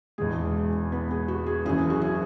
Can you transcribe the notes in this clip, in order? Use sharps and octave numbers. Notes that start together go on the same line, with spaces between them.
E1 E2 E3 G#3 G#4
B3 B4
G#4
F#4
G#4
F#1 F#2 E3 G#4
F#4
G#4